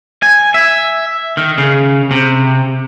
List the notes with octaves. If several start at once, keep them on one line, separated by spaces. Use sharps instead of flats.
G#5
E5
D#3
C#3
C3